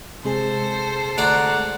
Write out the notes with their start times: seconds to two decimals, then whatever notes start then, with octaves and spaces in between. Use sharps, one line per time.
0.25 C3 G#3 G#4 A4 C5
1.18 D2 D5 F#5 A#5